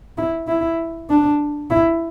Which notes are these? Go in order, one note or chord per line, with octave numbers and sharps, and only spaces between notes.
E4
E4
D4
E4